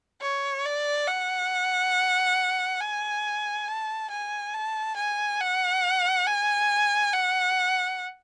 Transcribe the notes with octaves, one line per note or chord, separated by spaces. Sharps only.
C#5
D5
F#5
G#5
A5
G#5
A5
G#5
F#5
G#5
F#5